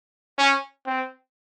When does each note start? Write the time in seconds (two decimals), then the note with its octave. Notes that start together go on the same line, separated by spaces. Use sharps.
0.38 C#4
0.86 C4